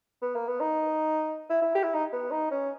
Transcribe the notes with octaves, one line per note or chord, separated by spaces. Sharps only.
B3
A#3
B3
D#4
E4
E4
G4
E4
D#4
B3
D#4
C#4